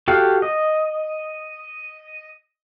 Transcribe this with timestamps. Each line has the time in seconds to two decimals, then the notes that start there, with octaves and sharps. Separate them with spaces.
0.08 F#4 G4 A4 F5 F#5
0.42 D#5